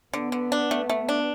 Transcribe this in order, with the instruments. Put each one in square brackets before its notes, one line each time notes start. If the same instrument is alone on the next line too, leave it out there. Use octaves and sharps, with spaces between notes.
[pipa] D3 [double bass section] B3
[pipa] D3
D4
A3
A3
D4